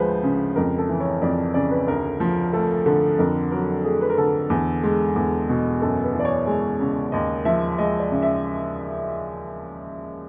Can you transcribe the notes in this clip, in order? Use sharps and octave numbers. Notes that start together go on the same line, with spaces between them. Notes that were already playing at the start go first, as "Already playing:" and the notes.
Already playing: D2 F3 G#3 B4 C5
C#3
F2 A#4
A4
E3
C#5
F2 D5
C#3 D5
B4
D2 A#4
F3
A3 A4
D3
F2 A#4
F#3 A#4
A3 G#4
B4
A#4
D3 A4
E2
G#3
E2
B2
F#2 A4
B4
E3
D5
C#5
G#3
C#3
D#2 D#5
F3 E5
G#3 D#5
D5
C#3
E5